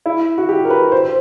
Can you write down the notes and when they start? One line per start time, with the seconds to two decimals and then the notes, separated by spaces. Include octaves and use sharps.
0.06 E4
0.38 F#4
0.49 G4
0.65 A#4
0.70 B4
0.92 C5
1.04 C5